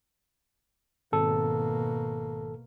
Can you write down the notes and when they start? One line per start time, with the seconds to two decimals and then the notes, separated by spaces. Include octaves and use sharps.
1.12 G#1 B2 A#3 A4